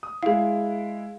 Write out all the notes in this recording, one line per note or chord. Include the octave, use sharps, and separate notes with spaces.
D#6
G#3 E4 G#4 F5